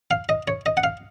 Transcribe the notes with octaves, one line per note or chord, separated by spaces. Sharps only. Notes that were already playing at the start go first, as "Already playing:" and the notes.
F5
D#5
C#5
D#5
F#5
F5